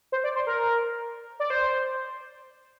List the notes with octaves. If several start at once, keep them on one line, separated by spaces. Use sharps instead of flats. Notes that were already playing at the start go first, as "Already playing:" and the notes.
C5
D5
C5
A#4
D5
C5